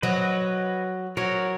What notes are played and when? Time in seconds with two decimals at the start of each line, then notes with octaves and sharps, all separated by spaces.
0.02 F#3 B4 D#5
1.17 F#3 A#4 C#5